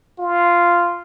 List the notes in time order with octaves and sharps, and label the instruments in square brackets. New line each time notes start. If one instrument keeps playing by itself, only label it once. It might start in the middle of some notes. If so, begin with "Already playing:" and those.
[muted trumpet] F4